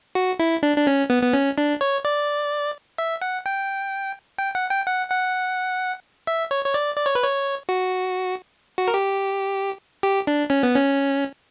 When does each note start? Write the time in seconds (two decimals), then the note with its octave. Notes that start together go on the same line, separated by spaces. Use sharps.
0.15 F#4
0.39 E4
0.63 D4
0.77 D4
0.87 C#4
1.10 B3
1.23 B3
1.34 C#4
1.58 D4
1.81 C#5
2.05 D5
2.98 E5
3.22 F#5
3.46 G5
4.38 G5
4.55 F#5
4.70 G5
4.87 F#5
5.10 F#5
6.27 E5
6.51 C#5
6.64 C#5
6.74 D5
6.97 D5
7.06 C#5
7.15 B4
7.24 C#5
7.69 F#4
8.78 F#4
8.88 A#4
8.94 G4
10.03 G4
10.27 D4
10.50 C#4
10.63 B3
10.76 C#4